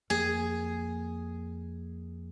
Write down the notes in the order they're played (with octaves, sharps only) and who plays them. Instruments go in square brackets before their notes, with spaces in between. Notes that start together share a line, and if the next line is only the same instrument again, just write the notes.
[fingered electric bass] F2 A#3 [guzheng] G#4